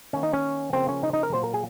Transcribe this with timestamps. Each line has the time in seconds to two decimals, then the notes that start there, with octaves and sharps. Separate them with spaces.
0.13 D#3 A#3 C#4
0.23 D#4
0.33 C#4
0.73 C#3 F3 A#3 C4
0.89 C#4
1.03 D#4
1.13 D#4
1.23 A#4
1.33 A#2 F#3 A#3 C5
1.44 A#4
1.54 G#4